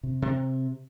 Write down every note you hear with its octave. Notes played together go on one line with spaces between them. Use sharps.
C3
C3